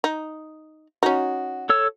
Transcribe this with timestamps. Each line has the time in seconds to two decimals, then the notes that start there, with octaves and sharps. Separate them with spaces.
0.04 D#4
1.03 C#4 D#4 F#4
1.69 A4 C#5 E6